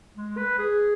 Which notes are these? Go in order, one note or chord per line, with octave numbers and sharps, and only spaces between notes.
G#3
B4
G#4